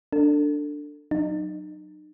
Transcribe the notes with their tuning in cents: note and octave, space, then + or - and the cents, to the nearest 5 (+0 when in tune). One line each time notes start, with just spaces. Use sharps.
D4 +0 A4 +25
F#3 +0 D#4 -40